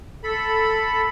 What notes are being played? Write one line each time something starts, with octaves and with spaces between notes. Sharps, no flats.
A4 B5